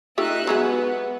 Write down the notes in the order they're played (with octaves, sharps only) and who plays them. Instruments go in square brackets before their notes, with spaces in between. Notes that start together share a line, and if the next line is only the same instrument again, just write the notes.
[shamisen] A3 F4 G4 [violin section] D#4 E5 F#6
[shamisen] F#3 G#3 F#4 [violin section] B3